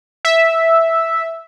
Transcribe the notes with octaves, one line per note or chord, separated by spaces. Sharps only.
E5